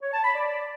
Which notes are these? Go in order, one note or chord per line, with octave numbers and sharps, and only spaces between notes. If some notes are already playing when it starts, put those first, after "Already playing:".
C#5
A5
B5
D5